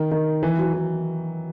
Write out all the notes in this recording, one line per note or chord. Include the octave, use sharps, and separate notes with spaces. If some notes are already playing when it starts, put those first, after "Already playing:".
Already playing: D#3
D#3
E3
F#3
E3